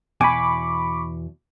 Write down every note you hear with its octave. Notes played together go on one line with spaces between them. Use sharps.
E2 B2 G#5 B5 C#6 D6